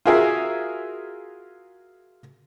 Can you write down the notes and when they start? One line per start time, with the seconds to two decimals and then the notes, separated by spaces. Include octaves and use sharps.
0.06 F4 F#4 G#4 A#4 E5 F5